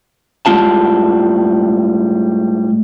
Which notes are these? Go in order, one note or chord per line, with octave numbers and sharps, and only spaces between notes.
A2 G3 G#3 C#4 F4 A5